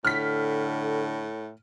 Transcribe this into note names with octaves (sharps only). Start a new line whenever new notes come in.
A2 D3 F6 B6